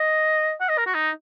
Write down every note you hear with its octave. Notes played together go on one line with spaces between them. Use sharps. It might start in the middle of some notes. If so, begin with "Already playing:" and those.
Already playing: D#5
F#5
D#5
A#4
F#4
D#4